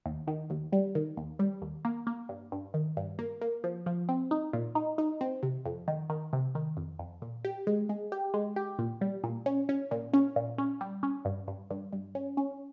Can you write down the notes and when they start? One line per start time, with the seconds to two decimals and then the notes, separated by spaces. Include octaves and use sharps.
0.06 D#2
0.27 D#3
0.50 D#2
0.72 G3
0.95 D#3
1.17 D#2
1.39 G3
1.62 D#2
1.85 A#3
2.07 A#3
2.29 G2
2.52 G2
2.74 D#3
2.97 G2
3.19 A#3
3.41 A#3
3.64 F3
3.86 F3
4.09 C4
4.31 D#4
4.53 A#2
4.75 D#4
4.98 D#4
5.21 C4
5.43 C3
5.65 F2
5.88 D#3
6.10 D#3
6.33 C3
6.55 D#3
6.77 F2
6.99 F2
7.22 A#2
7.45 G4
7.67 G#3
7.89 G#3
8.12 G4
8.34 G#3
8.56 G4
8.79 A#2
9.01 G3
9.24 A#2
9.46 C#4
9.69 C#4
9.91 A#2
10.13 C#4
10.36 A#2
10.58 C#4
10.81 G3
11.03 C#4
11.25 G2
11.48 G2
11.70 G2
11.93 G2
12.15 C#4
12.37 C#4